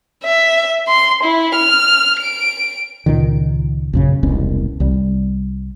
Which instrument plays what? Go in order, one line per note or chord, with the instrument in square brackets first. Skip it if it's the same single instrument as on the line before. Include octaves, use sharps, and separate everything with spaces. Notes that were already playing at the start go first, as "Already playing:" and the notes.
[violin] E5
C6
E4
F6
D7
[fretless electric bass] C#2 A#2 D#3
A#1 F#2 C#3
E1 C2 B2 C#4
C2 G3